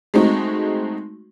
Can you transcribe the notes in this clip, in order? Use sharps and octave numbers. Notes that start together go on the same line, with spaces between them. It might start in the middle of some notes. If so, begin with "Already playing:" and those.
G#3 A3 C4 D#4 F#4